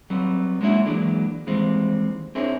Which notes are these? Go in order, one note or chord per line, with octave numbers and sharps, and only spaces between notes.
F#3 G3 B3 C4
G#3 A#3 C#4 D4 E4 F#4
E3 F#3 G#3 A#3 D4
D#2 E3 G3 G#3 C4
C4 D4 E4 G#4 A#4 C#5